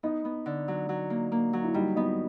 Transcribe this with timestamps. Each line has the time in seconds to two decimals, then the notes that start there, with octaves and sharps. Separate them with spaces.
0.03 B3 D#4
0.25 B3
0.46 D3
0.68 F#3
0.89 F#3
1.10 A#3
1.32 A#3
1.53 F#3
1.64 E4
1.74 G3 D#4
1.96 B3 D#4